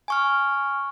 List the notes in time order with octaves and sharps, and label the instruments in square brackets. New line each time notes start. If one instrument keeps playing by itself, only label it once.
[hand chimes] G#5 C#6 F6